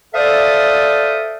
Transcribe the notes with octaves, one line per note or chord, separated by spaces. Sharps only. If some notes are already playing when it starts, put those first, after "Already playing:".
A4 C5 D5 E5 F5 D#6